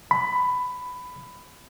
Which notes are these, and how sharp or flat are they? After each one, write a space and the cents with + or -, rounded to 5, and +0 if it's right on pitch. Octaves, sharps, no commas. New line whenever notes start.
B5 +15